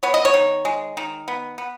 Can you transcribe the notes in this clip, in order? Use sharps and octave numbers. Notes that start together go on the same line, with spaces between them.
B3 C#5
D#5
C#5
D#3
G#3
D#3
B3
B3